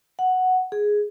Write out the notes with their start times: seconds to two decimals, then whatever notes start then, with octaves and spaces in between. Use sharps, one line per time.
0.19 F#5
0.72 G#4